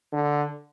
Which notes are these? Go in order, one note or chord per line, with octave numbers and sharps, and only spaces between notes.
D3